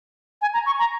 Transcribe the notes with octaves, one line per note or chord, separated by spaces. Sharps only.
G#5
A#5
C#6
A#5